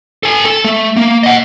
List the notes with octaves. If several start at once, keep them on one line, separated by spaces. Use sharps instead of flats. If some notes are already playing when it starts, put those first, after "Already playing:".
A4 G#5
A4
A3
A#3
D#5 F#5